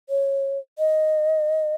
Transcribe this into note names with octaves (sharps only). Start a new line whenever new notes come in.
C#5
D#5